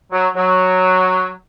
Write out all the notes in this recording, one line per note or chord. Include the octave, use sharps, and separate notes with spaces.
F#3
F#3